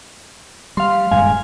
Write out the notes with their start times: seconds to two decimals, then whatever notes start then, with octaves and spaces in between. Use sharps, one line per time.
0.77 G3 F5 C6
1.11 D#1 G2 G#3 F5 G#5